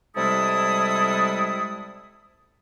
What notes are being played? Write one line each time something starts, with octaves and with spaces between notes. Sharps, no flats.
C3 G3 G#3 E4 A4 D#6